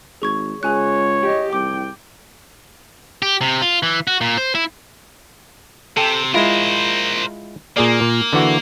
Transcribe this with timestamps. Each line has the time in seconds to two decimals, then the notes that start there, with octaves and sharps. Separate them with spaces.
0.22 G#1 G#4 C#6 G#6
0.63 C#2 G#4 C#5 G#5 F#6
1.22 G4 D#5
1.53 C2 G5 D6
3.22 G4
3.41 C3
3.62 F4
3.83 E3
4.07 F#4
4.21 A#2
4.38 C5
4.55 E4
5.97 C3 A4 G5
6.34 G#3 E4 F4 A#4 C5
7.77 A#2 A#3 G#4 D5
8.01 A#2
8.33 D3 E3 F#4